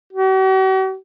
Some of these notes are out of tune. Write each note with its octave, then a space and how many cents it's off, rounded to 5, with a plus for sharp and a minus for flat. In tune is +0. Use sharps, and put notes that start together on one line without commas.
F#4 +45